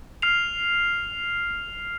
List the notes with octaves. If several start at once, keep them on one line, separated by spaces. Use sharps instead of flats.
F6 C7 F7